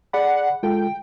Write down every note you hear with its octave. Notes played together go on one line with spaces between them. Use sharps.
G#4 D5 F#5 B5
G#3 F4 A4 G5